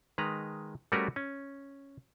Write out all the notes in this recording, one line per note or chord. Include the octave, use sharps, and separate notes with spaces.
D#3 G#3 B4 A#5
G3 A3 C#4 F#4 A#4 B4
C#4